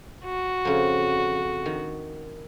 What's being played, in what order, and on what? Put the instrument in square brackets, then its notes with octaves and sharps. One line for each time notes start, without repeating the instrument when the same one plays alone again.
[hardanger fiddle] F#4
[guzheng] F2 C#3
D#3